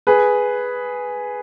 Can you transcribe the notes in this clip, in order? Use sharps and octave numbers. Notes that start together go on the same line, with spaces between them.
G#4 B4